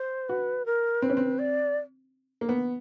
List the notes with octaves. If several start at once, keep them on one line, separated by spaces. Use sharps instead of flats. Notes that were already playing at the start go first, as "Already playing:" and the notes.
Already playing: C5
F#4 B4
A#4
C4 B4
C#4
C4
D5
A#3
B3